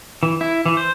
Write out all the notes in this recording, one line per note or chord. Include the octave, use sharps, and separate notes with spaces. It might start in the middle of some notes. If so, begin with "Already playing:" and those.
E3
E4
E3
C5